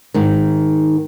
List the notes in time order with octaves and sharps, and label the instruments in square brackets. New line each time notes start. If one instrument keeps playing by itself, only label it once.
[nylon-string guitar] G#2 D#3